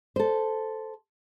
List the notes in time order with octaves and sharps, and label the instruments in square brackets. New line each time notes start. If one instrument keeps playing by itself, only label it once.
[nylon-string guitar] A4 C5